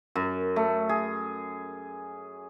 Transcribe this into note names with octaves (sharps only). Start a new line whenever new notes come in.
F#2
A3
G#4